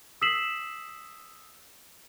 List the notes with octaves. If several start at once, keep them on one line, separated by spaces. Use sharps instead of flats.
D#6 E6 B6 C7 E7 F#7